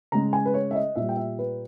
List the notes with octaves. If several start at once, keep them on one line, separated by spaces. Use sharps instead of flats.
C#3 G#3 A#5
G#5
B4
C#5
E5
D#5
A#2 G3 E5
G5
E5
B4